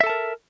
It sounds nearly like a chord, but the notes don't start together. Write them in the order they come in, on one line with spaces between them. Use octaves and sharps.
E5 A4 A5 A#4